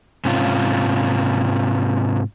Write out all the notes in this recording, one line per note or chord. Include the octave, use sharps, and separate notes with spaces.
G#2 C3 C#4 F4